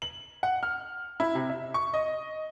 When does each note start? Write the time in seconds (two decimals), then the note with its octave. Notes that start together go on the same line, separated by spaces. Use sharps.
0.02 F#7
0.43 F#5
0.63 F6
1.20 E4
1.35 C3
1.50 E5
1.74 C#6
1.94 D#5